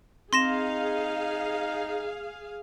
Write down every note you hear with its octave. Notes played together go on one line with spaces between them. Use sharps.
C4 D#4 G#4 F5 C6 A#6 E7